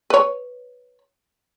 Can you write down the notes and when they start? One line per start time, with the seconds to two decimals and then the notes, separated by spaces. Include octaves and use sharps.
0.10 B4 C#5